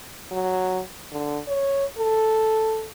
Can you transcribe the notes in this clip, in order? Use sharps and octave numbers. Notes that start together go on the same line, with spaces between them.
F#3
D3
C#5
A4